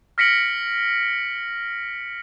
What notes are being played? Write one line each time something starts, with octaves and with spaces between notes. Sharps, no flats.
F6 A#6 B6 C#7 D7 F#7